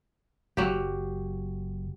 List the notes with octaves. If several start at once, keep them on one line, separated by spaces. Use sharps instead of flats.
F#1 F#3 G4